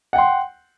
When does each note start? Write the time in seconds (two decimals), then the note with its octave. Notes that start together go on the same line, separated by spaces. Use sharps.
0.13 F#5
0.16 G5
0.18 C6